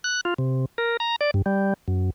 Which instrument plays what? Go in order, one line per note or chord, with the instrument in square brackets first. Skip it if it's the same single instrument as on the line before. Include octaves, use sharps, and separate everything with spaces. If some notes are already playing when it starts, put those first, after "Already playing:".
[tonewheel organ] F#6
F4
C3
A#4
A#5
D5
G2
G3
F#2